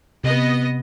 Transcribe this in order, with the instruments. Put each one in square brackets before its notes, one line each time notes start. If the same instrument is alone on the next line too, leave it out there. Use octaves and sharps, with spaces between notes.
[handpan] C3 [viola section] B3 D#5